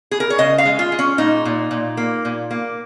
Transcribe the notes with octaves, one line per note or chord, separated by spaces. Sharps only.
G#4
A#4
C#5
C#3 D#5
F5
G#3
F4
G#3
C#4
A#2 D#4
A#2
A#2
A#3
A#2
A#3